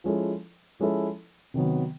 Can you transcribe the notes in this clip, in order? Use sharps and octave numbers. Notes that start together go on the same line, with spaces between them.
F3 G#3 C#4 E4 A4
F3 G#3 C#4 E4 A4
C3 D#3 F#3 B3